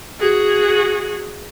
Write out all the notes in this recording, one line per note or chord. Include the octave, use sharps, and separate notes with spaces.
F#4 G#4